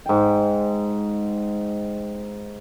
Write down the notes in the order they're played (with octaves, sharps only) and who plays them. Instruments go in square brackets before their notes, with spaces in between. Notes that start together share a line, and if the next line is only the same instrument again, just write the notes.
[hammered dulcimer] G#2 G5